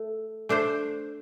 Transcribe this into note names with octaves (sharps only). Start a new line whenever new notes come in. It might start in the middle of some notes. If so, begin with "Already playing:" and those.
Already playing: A3 A4
A3 D4 C5